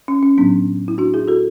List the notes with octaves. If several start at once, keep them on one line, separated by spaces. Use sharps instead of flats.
C#4
C#4
A2 F#3 B3 D4
E4
D4 F#4
E4 G#4
F#4 A4